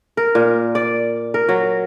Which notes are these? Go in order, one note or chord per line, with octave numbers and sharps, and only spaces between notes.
A#4
A#2
D5
A#4
F#3